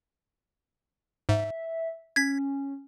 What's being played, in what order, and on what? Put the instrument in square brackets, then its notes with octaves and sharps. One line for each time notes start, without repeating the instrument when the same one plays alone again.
[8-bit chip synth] G#2 [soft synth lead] E5
[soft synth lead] C#4 [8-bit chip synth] G#6 B6